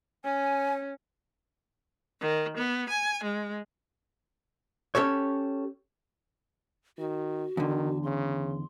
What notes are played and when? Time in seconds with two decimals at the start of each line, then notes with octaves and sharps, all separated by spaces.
0.25 C#4 G#5
2.20 D#3
2.56 B3
2.88 G#5
3.23 G#3
4.95 C#4 G4 A4 C#5
6.98 D#3 F#4
7.57 E2 D3 D#3
8.03 C#3 C6